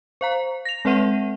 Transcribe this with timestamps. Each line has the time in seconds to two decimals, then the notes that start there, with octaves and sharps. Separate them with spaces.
0.21 C5 F5 A#5
0.65 A#6 F7
0.85 G#3 C4 B4 E5 F#5 D#7